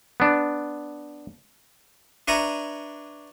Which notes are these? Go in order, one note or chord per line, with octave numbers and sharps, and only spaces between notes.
B3 D4
D4 B4 E5 G#5 A#5 C#6